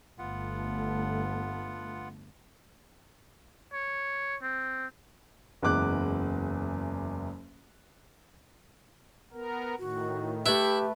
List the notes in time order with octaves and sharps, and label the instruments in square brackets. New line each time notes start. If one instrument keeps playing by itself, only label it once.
[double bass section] G1 A3 [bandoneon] B3 F4 F#5
[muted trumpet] C#5
C4
[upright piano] F#1 E2 G#3 D6 F#6
[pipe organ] B3 A#4
[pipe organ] A2 D#3 [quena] F#4
[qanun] A3 B4 [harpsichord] E4 [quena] G4